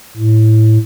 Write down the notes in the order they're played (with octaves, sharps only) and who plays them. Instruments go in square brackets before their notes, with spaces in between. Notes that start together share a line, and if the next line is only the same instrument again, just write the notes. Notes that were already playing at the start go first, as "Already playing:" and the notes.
[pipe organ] A2